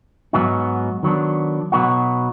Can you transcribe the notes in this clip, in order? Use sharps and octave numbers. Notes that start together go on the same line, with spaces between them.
G#2 F#3 B3 D#4 F#4
D#3 F#3 B3 D4
B2 F#3 B3 D#4 F#4